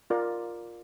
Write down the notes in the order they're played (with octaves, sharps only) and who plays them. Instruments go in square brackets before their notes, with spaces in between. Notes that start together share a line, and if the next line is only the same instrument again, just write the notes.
[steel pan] F4 A#4 D5